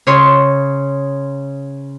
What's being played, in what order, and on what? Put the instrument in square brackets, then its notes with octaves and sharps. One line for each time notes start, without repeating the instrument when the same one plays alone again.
[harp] C#3 C#5 C6